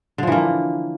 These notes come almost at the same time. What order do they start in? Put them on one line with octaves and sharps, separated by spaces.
D3 F3 E3 A#3